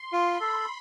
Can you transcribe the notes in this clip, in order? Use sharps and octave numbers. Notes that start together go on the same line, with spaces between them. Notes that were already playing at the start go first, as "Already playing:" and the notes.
Already playing: C6
F4
B5
A4